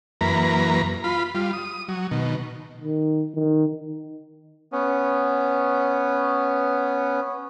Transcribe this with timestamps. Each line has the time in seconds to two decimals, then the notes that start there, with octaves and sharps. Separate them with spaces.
0.21 F#2 E3 A#3 B4 A#5
1.04 F4 B5
1.35 G3 F4
1.53 D#6
1.89 F#3
2.11 B2 D#3
2.81 D#3
3.34 D#3
4.72 B3 C#4